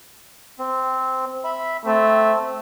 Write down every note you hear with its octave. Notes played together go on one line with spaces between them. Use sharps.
C4
E5 B5
A3 C4